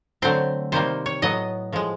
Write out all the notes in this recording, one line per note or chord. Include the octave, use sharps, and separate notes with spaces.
D3 F#3 A3 C4 C5
C3 D#3 G3 A#3 C5
C#5
A2 F#3 B3 D#5
A2 F3 G#3